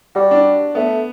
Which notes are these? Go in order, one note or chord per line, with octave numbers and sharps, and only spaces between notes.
G3 F#4
D4
A3 B3